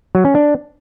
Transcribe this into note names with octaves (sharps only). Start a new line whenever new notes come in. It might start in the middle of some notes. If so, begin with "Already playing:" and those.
F#3
C#4
D4